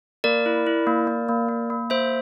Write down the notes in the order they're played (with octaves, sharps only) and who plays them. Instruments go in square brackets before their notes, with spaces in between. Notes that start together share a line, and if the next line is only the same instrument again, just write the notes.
[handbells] A#3 A#4 D5
E4
E4
A#3
A#3
A#3
A#3
A#3
A#3 C5 E5